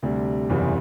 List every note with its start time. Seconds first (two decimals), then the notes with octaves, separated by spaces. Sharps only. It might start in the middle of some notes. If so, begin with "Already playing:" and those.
0.02 D2 C3 G3 D4
0.49 F#1 E2 C3 E3 G3